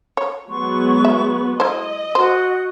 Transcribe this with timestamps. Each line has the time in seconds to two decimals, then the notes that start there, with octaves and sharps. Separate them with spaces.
0.17 C#5
0.48 F#3 G#3 B3 C6 C#6
1.05 E5
1.60 E4 C5 D#5
2.15 F#4 C5